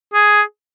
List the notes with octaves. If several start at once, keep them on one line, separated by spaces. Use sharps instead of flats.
G#4